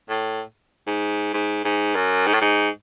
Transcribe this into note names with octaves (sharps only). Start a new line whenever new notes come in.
A2
G#2
G#2
G#2
F#2
G#2
A2
G#2